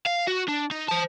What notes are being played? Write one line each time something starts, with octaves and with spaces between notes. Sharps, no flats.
F5
F#4
D4
D#4
C5 A5